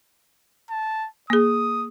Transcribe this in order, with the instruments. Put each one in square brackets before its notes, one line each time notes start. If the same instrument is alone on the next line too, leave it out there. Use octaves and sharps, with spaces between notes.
[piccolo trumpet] A5
[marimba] A#3 G#4 [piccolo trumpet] D#6